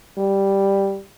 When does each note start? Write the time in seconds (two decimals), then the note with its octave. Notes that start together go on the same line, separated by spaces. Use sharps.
0.18 G3